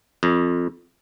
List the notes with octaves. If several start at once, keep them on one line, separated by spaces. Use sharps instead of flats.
F2